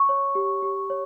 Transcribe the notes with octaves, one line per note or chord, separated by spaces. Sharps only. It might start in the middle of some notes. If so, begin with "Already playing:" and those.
Already playing: C#6
C#5
G4
G4
C#5